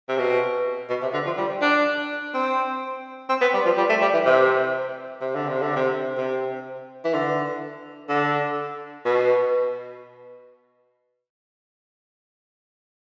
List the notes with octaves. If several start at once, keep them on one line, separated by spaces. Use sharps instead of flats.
C3
B2
B2
C3
D3
F3
G3
D4
C4
C4
B3
G3
F3
G3
A3
G3
E3
C3
C3
D3
C3
D3
C3
C3
E3
D3
D3
B2